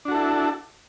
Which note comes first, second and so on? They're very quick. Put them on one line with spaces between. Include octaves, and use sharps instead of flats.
D4 F#4 A4 E4